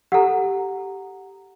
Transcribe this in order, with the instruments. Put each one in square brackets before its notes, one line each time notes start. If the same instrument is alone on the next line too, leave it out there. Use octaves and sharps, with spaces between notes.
[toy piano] G4 A4 [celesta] F#5 A#5